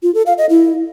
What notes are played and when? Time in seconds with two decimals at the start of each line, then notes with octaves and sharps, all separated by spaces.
0.03 F4
0.15 A4
0.26 F5
0.38 D#5
0.50 E4